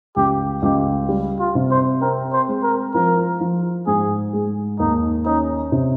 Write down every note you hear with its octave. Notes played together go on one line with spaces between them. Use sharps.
C#2 G4
C#2 G4
G3
F4
C3
C5
C4 A#4
C5
G#3
A#4
F3 A#4
F3
G#2 G#4
G#3
D#2 D#4
C#4 D#4
C3